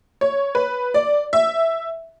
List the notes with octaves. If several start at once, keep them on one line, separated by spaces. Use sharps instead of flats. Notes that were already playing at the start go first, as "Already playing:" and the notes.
C#5
B4
D5
E5